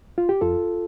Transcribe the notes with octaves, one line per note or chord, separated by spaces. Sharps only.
F4
G4
F2 F4 A4